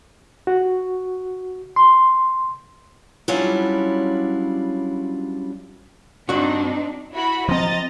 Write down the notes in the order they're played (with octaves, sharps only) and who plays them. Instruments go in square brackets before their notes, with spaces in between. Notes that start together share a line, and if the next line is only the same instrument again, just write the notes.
[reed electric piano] F#4
C6
[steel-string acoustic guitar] F#3 G3 C#4 D4 E4 F4
[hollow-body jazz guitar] G2 F#4 [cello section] C4 D4 D#4
[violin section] E4 F#4 B5
[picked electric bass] F3 C4 [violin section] D#5 A#5 A6